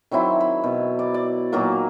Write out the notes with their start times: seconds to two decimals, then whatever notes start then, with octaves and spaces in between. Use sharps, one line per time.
0.11 D#3 F#3 C4 E4
0.40 B5
0.64 B2
0.99 D5
1.14 D5
1.52 A#2 D#3 F#3 A#3